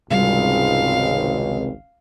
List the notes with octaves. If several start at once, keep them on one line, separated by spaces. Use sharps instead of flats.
G#1 C#2 C3 G3 F5